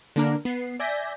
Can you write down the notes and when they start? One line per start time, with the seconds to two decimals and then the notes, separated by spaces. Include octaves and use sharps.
0.16 D3 A#3 D4 A#4
0.45 B3 C7
0.79 D5 E5 G#5 G6 A#6 B6